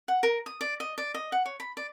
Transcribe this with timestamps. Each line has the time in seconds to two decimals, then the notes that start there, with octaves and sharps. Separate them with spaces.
0.08 F#5
0.23 A#4
0.46 D#6
0.61 D5
0.80 D#5
0.98 D5
1.14 D#5
1.32 F#5
1.46 C#5
1.60 B5
1.77 D5